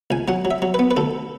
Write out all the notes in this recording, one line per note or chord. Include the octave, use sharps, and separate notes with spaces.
C#2 G#5
F#3 F#5
F#3
E5
F#3
B4
B3
B4
D2 A4